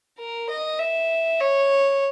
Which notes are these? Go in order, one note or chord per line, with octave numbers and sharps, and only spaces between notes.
A#4
D#5
E5
C#5